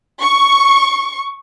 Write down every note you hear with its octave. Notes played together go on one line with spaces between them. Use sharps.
C#6